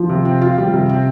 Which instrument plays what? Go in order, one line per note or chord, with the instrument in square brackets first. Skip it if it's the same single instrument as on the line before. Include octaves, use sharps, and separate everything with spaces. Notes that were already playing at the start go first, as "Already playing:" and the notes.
Already playing: [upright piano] F3
[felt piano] C3
C4
F4
G3
C3
C4